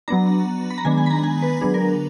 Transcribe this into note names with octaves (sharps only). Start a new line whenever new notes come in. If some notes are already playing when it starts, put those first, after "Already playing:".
F#3 B3 D4 A#5
B5
A#5
D#3 G#3 B3 D4 G#5
G#5
B5
A#5
G#5
B4
D3 F#3 B3 D4 G#4
A#4